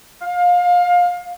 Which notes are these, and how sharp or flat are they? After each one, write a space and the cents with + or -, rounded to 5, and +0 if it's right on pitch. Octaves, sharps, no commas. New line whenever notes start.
F5 +25